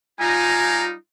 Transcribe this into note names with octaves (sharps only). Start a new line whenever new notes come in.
G3 D#4 F4 F5 G#5 A#5